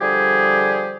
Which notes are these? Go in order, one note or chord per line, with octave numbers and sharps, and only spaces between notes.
D3 F3 G3 G4 G#4